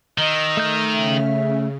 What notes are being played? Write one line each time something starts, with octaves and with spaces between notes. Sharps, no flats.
D#3 D#5 E6
A3 F6 G6
C#3 E5